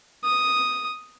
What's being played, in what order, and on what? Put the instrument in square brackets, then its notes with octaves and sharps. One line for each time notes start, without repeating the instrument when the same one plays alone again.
[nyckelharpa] D#6